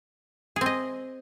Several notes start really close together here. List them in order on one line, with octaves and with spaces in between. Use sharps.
G#4 C4 D#5